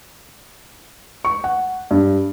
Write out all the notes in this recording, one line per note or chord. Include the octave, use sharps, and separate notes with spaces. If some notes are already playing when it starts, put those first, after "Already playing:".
C#6
F#5
G2